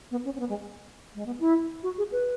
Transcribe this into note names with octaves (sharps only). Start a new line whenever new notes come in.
B3
C#4
C#4
B3
G#3
G#3
B3
E4
F#4
G#4
B4